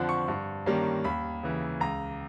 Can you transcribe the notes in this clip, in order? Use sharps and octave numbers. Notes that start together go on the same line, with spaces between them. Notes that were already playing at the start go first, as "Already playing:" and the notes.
Already playing: F2 D3 F3 F#6
C#6
G2
D#3 G3 A#3 C#4
D#2 B5
C#3 E3
C#2 A#5